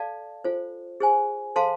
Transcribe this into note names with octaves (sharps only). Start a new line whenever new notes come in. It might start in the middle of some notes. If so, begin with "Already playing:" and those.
Already playing: A4 D5 F5 A5
F4 A4 C5
G#4 C5 G#5
A4 C5 F5 A5 C6